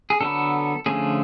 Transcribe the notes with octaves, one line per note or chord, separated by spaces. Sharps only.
G#4
D3 F#3 B3 A4
D3 F3 A3 C#4 G#4